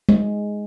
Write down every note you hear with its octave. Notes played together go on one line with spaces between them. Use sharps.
G#3